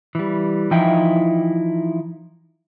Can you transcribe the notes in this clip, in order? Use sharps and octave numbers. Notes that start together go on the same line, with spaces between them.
E3 G3
E3 F3 D#4 E4 G5